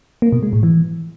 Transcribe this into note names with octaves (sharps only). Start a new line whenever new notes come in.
A#3
B2
G#3
A2
E3